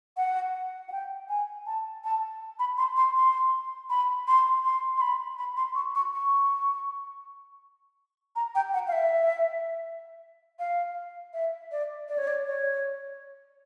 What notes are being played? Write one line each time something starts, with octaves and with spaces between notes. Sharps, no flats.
F#5
F#5
G5
G#5
A5
A5
B5
C6
C6
C6
B5
C6
C6
C6
B5
B5
C6
C#6
C#6
C#6
A#5
G5
F#5
F5
E5
F5
E5
D5
D5
C#5
D5
C#5